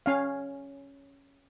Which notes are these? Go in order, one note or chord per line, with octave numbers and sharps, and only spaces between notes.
C#4 F5